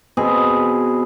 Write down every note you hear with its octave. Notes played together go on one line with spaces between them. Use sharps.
B2 C4 G#4